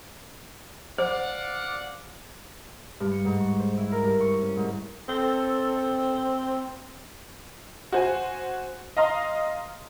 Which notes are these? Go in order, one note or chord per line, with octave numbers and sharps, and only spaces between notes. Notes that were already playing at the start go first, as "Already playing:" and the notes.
C5 D5 F5 F#5
G2
C#7
G#2
C#6
C5
E4
A#4
G2
C#6
C#4
G#2
C4 A4
F#4 C5 G#5
D#5 F5 A#5 C6